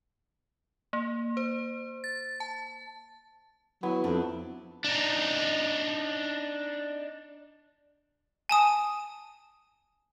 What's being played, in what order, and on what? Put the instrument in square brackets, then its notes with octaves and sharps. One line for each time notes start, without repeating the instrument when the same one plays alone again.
[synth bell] A#3
C5
A6
A5
[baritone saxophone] F#3 [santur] B3 [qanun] E4
[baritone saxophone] F2 [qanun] D4
[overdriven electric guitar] D4 D#4
[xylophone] G#5 A5 D#6